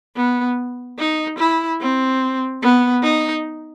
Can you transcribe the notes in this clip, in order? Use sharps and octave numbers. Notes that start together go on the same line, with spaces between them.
B3
D#4
E4
C4
B3
D#4